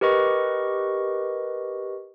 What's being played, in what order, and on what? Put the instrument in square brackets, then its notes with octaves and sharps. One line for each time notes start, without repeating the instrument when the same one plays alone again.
[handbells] G4 A#4 B4 D#5 C#6